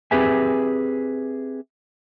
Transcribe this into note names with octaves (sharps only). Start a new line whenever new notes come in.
C4 G4 G#4 B4 E5 G#5